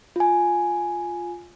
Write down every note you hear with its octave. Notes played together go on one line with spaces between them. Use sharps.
F4 G#5